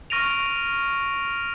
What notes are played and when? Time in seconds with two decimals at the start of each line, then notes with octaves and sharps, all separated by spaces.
0.10 C#6 F6 A#6 D7 D#7 F7